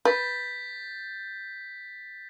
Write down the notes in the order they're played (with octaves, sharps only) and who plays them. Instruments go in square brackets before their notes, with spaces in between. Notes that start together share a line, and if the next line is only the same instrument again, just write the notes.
[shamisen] B4 [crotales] G6 A6 B6